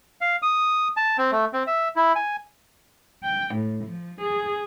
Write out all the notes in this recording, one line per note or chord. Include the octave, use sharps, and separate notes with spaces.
F5
D#6
A5
C4
A3
C4
E5
E4
G#5
G5
A2
F3
G#4